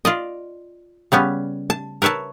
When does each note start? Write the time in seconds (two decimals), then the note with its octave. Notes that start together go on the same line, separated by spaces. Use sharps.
0.05 F4 D5 D#5
1.12 C#3 G3 B3 C#4
1.70 A5
2.02 A#4 B4 C#5 E5 A5